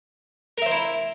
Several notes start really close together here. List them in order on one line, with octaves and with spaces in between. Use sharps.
A#4 E5 C5 E4